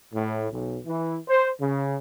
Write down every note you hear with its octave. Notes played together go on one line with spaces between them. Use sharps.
A2
B1
E3
C5
C#3